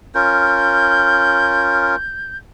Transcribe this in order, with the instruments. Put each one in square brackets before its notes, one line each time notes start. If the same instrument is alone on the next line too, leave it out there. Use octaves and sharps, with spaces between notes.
[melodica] C#4 F4 A#4 [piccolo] G6